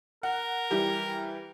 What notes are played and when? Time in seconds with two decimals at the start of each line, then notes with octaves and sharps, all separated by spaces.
0.23 A#4 F#5
0.70 E3 G3 G4